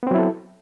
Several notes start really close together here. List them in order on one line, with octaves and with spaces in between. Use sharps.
B3 C4 F#3 E4 A4